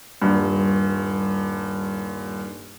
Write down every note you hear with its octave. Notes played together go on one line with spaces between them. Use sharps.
D#1 G2